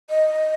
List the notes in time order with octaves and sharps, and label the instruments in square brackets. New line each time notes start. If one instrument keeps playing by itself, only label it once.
[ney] D#5